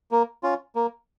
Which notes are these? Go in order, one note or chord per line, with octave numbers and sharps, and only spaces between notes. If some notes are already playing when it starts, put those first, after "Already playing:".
A#3
C#4 F4
A#3